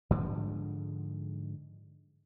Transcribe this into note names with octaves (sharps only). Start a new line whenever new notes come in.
G#2 D3 F3 G#3